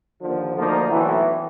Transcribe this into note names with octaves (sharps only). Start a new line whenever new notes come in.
D#2 D3 F3
D2 D3 F3 A#3 D#4
B1 A2 E3